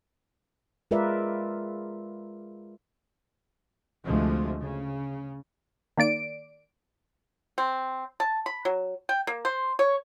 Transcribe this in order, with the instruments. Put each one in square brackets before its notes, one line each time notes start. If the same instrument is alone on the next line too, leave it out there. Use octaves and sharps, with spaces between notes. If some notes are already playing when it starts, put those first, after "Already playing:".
[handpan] G#3 F4 A#4 B4 D5 E5
[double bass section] D2 C3 F3 G#3 A3
C#3
[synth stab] D#3 A#3 D5 D7
[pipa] C4
A5
B5
F#3
G5
A#3
C5
C#5